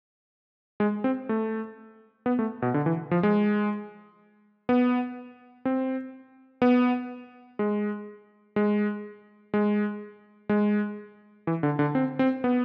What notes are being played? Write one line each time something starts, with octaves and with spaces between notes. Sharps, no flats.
G#3
C4
A3
B3
A3
B2
D3
E3
F3
G#3
B3
C4
B3
G#3
G#3
G#3
G#3
E3
D3
D3
C4
C4
B3